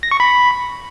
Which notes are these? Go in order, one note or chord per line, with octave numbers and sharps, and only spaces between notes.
A#6
C#6
B5